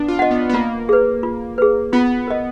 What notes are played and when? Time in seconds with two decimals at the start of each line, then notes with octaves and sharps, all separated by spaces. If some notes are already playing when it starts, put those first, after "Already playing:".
Already playing: B3 D4
0.08 F4
0.19 D#5 F#5
0.31 B3
0.49 B3
0.53 A#3 F4
0.89 G#4 B4
1.23 F4
1.58 G#4 B4
1.93 B3 F4
2.28 A#4 D#5